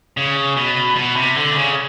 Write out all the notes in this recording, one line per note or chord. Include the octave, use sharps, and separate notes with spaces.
C#3
B2
B2
C3
D3
C3
C#3